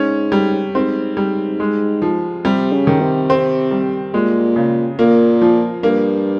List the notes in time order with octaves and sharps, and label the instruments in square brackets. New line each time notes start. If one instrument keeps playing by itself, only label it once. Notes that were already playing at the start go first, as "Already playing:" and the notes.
Already playing: [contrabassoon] G#2 [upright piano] C#4
[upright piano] G3
[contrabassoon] G#2 [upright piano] C4
[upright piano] G3
G#3
F3
[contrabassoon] C3 [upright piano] G3
[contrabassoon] C#3
[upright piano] D#3
[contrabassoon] C3
[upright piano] C4
G3
[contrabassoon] A#2 [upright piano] G#3
[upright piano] C#3
[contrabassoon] A#2 [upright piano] A#3
[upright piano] F3
[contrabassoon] G2 [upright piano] A#3